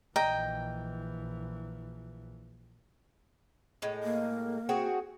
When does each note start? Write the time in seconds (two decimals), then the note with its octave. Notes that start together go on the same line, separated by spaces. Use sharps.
0.16 A#1 E3 D#5 G5 A#5
3.82 A2 G#3
4.03 A#3
4.69 C4 F#4 G#4